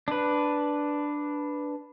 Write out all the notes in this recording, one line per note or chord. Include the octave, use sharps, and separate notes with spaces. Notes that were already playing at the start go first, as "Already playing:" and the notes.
D4 B4